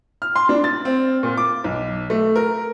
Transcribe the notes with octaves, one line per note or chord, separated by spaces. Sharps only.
F6
C6
D4
A6
C4
A#2
D6
B1
A3
A#4